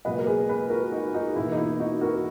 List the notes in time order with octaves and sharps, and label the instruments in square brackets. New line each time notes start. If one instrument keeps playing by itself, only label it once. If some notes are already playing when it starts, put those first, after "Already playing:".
[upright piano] C#2 B2 F#3 A#3 B4 D#5
A#4
G#4 B4
G#4 B4
F#4 A#4
D#4 F#4
D#4 F#4
E2 B2 A#3 E4
D#4
E4
D#4 F#4
F#4 A#4